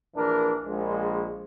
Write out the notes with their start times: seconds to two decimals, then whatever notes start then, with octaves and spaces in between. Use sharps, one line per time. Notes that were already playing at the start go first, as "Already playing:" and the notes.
0.15 A#1 E3 D4 A#4
0.65 A#1 G#3